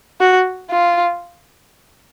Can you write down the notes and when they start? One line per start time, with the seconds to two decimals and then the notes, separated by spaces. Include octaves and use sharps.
0.20 F#4
0.70 F4